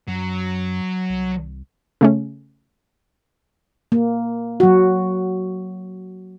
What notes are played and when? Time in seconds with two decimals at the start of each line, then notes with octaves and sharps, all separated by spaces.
0.07 F#2 F#3
1.10 C2
2.01 C#3 A3 C#4
3.92 A#3
4.60 F#3 F#4